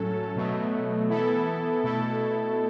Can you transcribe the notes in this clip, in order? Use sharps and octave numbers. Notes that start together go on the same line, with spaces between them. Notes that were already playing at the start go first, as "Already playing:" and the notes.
Already playing: A2 F#3 C#4 A4
B2 F#3 A3
E3 B3 E4 A4
B2 A3 E4 A4